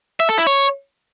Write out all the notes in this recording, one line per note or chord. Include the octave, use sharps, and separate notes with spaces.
E5
A4
E4
C#5